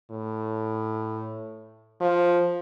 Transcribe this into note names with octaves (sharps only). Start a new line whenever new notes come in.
A2
F3